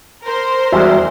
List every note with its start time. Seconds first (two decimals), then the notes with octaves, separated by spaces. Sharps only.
0.24 A#4 C5 C6
0.72 E2 G3 G#3 F#4 E5